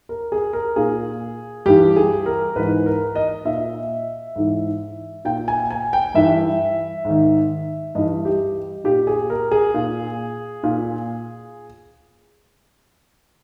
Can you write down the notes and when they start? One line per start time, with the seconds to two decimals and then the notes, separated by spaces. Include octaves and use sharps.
0.09 A#4
0.32 G#4
0.53 A#4
0.76 A#2 G#4
1.66 G2 E3 G4
1.96 G#4
2.26 A#4
2.56 G#2 E3 B4
2.86 A#4
3.15 D#5
3.45 A#2 E5
4.36 G#2 E3
5.25 A#2 G5
5.48 G#5
5.70 G#5
5.93 G5
6.14 G2 E3 E5
7.05 G#2 D#3
7.95 G2 E3 D#5
8.25 G4
8.84 A#2 G4
9.07 G#4
9.30 A#4
9.51 G#4
9.74 A#2
10.63 A#2